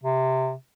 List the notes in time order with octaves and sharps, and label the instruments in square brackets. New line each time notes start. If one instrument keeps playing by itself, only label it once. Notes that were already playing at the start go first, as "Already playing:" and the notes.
[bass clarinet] C3